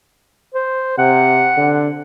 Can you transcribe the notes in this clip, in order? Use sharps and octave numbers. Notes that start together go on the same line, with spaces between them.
C5
C3 F#5
D3